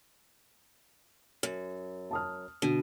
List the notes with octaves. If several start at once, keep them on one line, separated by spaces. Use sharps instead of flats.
F#2
A5 D#6 F6
B2 D3